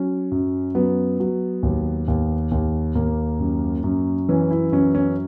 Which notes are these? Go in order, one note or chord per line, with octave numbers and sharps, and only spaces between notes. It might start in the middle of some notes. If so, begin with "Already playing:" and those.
Already playing: F#3 C#4
F#2
F#3 B3
F#3
D#2
D#2
D#2
D#2 A#3
F#2
F#2
E3 C#4
E4
F#2 C#4
C#4